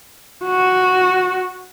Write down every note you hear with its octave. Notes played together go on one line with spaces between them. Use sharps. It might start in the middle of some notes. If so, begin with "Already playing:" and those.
F#4